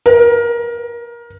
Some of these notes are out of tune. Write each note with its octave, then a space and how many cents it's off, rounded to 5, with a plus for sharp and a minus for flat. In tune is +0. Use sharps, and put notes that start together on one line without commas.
A#4 +20